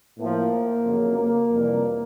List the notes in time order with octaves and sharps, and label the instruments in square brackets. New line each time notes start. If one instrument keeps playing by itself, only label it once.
[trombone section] A2 F3 A#3
F2 C#3 F#3
A#3
F2 C3 E3 G3